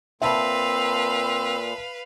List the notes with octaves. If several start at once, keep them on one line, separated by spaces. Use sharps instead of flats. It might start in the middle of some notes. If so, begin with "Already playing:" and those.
A#2 C4 B4 E5 F5 A5 B5